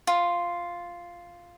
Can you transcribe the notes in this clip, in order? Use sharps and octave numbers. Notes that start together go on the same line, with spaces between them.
F4